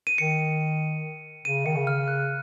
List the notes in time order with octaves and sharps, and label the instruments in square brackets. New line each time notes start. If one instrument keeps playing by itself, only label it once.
[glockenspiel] D#7
[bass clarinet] D#3 [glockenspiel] C#7
[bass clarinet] C#3 [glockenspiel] D#7
[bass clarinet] D#3 [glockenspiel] C#7
[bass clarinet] C#3
[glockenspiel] F6
F#6